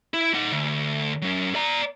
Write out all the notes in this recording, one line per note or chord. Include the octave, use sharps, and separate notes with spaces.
E4
D#4 F#5
D2
F#3 C#4
D5 A#5